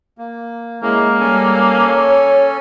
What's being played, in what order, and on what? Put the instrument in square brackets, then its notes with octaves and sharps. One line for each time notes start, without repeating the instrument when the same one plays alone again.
[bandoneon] A#3
[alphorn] G#3 [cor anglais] A#3 [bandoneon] C#4 E4
[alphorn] G3 [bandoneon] C#4 A4 G#5
[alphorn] C#5